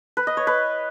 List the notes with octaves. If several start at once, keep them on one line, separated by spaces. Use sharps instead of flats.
B4
D#5
C#5
B4